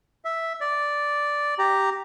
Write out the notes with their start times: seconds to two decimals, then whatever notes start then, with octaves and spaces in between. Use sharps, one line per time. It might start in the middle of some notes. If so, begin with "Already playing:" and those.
0.25 E5
0.61 D5
1.59 G4 A#5